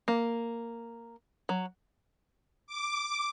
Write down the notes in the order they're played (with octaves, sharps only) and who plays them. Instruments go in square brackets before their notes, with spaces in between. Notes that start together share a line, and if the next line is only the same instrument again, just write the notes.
[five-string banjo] A#3
F#3
[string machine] D6